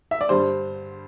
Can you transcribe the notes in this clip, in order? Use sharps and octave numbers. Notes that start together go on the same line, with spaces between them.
E5
D5
G2 D3 G3 C5